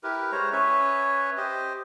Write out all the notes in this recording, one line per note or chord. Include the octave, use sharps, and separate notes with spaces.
E4 G4 A#4 B4
G#3 C5 C#5 A#5
C#4 B4 C#5 E5
G4 C5 D#5